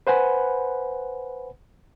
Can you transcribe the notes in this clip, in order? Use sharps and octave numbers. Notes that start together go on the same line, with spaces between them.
B4 C5 F#5 G#5 B5